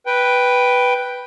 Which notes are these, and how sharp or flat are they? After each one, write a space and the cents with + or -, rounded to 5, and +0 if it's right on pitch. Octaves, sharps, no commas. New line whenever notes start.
B4 +0 G5 +0